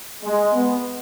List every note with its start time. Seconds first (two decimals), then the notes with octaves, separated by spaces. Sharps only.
0.23 G#3
0.53 B3